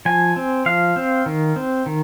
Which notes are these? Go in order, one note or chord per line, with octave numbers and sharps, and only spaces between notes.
F3 G#5
C4
F3 F5
C4
D#3
C4
D#3